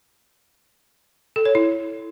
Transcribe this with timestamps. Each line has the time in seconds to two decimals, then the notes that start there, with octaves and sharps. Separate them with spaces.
1.36 A4
1.45 C#5
1.55 E4